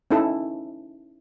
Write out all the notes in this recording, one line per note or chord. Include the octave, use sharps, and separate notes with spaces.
C#4 D#4 E4 A4